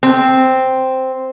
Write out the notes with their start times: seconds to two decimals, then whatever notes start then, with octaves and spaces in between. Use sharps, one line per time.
0.03 C4